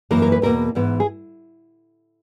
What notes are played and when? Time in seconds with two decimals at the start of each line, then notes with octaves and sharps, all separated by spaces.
0.11 F#2 E3 A#3 A#4
0.22 A#4
0.32 B4
0.42 E2 B2 A#3 A#4
0.75 G#2 E3 B3
1.00 G#4